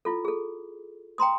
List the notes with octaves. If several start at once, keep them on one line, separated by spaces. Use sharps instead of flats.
E4 F4 A4
G#4 A4
G5 A#5 C6 D#6